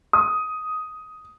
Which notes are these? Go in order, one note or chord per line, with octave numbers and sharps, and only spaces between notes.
D#6